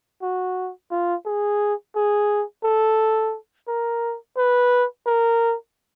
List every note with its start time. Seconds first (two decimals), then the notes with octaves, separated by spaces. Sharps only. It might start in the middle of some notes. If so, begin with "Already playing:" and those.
0.23 F#4
0.91 F4
1.26 G#4
1.96 G#4
2.64 A4
3.68 A#4
4.37 B4
5.07 A#4